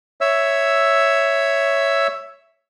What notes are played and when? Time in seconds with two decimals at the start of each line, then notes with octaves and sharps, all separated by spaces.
0.21 C#5 E5 E6